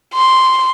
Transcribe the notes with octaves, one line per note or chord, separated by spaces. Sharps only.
C6